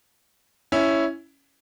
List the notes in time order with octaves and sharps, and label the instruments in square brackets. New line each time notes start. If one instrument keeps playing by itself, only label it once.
[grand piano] C#4 E4